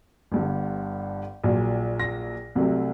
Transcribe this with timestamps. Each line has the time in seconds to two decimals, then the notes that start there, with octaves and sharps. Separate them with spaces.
0.32 G1 G2 D3
1.44 A#1 A#2 F#3
2.00 A#6
2.55 C2 C3 F#3 A3